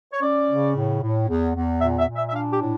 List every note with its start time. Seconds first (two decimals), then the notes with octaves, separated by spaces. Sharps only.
0.13 C#5
0.22 C#4 D5
0.49 C#3
0.76 A2
1.02 A2
1.28 E2
1.55 E2
1.81 A#2 E5
1.99 E5
2.08 A#2
2.16 E5
2.29 E5
2.34 D4 F5
2.52 G4
2.61 A2